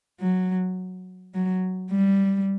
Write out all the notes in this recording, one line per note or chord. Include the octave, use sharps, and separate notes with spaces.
F#3
F#3
G3